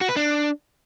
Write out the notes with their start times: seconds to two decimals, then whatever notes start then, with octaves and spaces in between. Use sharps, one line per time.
0.01 F#4
0.09 B4
0.16 D4